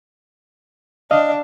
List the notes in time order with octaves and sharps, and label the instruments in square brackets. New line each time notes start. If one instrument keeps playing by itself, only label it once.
[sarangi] D4 [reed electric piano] D5 D#5 F5